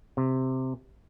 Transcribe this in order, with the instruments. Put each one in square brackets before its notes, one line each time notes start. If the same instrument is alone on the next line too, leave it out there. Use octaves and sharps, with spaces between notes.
[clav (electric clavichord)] C3